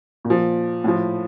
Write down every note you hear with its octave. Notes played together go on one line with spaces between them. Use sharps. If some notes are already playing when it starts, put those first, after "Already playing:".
A#2
F3
A2 F3